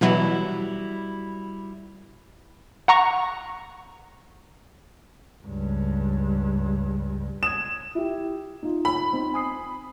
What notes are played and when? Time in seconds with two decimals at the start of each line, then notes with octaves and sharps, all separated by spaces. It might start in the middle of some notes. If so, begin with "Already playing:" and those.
0.01 B2 E3 F#3 G3 E4 F#4
2.88 F#5 A#5 C#6
5.45 C#2 G2
7.43 D#6 G#6 E7
7.95 E4 G4
8.63 D#4 F4
8.85 B5
9.13 C4 D#4
9.34 G#5 D#6 C7